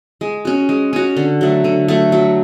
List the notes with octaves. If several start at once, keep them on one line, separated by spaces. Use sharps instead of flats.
G#3
C#4 F#4
G#3
C#4 F#4
D3
F#3 A3
D3
F#3 A3
F#3